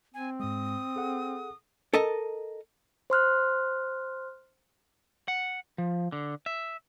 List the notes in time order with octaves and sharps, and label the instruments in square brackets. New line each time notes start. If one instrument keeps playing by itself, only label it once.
[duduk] C4 [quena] G#5
[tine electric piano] G#2 G#3 [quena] D#6
[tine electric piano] G#4 A4 F#5
[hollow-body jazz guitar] A4 A#4 D#5 A5
[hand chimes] C5 C6 F6 F#6
[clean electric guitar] F#5
F3
D3
E5